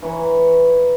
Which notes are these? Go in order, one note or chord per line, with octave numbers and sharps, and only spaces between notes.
E3 C#5 A#5